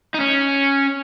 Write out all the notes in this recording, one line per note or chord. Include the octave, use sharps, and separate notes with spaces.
D#4
C#4